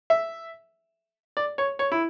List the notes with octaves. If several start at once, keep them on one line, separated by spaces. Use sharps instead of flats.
E5
D5
C#5
C#5
E4